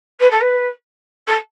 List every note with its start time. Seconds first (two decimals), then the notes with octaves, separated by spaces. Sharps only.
0.20 B4
0.30 A4
0.40 B4
1.27 A4